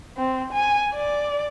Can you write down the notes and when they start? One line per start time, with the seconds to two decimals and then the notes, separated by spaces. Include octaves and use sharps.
0.17 C4
0.53 G#5
0.95 D5